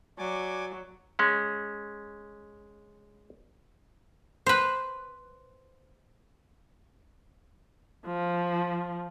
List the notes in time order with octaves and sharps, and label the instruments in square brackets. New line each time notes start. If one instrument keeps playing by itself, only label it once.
[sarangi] F#3 [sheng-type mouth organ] D5 G#5 D6
[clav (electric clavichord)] G#3 C#4
[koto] B4 C5
[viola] F3